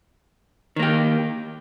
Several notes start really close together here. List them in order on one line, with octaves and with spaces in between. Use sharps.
D#3 A#3 G4